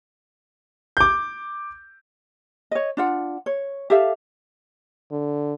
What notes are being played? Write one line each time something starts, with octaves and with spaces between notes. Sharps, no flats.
D6 G6
C#5 D#5
D4 F4 F#5
C#5
G4 A4 E5 F5
D3